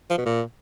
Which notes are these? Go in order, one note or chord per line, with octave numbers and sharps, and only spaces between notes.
F3
B2
A#2